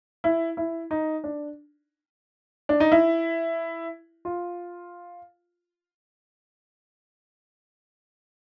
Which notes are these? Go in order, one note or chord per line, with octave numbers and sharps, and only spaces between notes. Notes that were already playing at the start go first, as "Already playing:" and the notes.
E4
E4
D#4
D4
D4
D#4
E4
F4